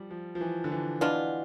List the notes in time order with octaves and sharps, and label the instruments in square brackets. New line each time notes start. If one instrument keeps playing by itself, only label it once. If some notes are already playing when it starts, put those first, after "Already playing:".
Already playing: [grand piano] F3 G3
F3
F3
E3
D3
E3
[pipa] B2 B3 D4 F4 [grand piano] E3